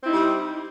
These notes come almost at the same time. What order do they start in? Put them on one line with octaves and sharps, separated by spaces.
C4 E4 D#4 G3